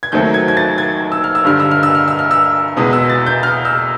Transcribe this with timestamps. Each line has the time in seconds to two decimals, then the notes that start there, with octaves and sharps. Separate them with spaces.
0.03 G#6
0.12 D#2 D#3 F#3 A3 C4 G6
0.34 G#6
0.48 G#6
0.57 A6
0.78 G#6
1.12 E6
1.24 F6
1.35 E6
1.44 G2 D3 G3 F6
1.60 E6
1.71 F6
1.83 E6
1.95 F6
2.08 E6
2.19 F6
2.31 E6
2.77 E2 B2 G#3 B3 D#6
2.93 E6
3.10 A6
3.27 G6
3.43 F6
3.65 E6